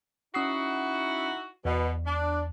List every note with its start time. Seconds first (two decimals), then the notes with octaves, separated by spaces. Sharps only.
0.34 C#4 D#4 E4 F#4 D#6 C7
1.65 E2 B2
2.06 D4